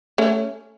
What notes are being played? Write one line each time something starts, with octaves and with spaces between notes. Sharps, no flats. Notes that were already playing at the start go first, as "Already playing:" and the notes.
A3 C#4